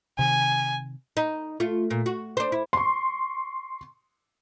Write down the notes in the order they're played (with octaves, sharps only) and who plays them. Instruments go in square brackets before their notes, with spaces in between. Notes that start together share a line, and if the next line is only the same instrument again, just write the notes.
[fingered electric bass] C3 D#3 [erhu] G#5
[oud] D#4
A3 F4
A#2
F#4
D4 C5
E4
[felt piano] C6 C#6